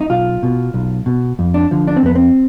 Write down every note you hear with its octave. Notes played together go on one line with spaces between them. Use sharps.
D#4
B1 F4
B2
B1
B2
F2
D4
D3 F3
D4
C4
F2 B3
C4